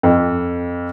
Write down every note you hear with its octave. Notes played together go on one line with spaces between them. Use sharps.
F2